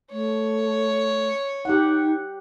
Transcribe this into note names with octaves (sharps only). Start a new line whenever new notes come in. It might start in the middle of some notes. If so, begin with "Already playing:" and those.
A3 C#5
D#4 G4 F#5